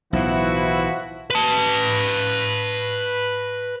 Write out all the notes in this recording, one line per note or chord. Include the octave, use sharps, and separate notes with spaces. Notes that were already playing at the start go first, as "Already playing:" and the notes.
B1 A2 E3 F3 E4 F#4
B4 A5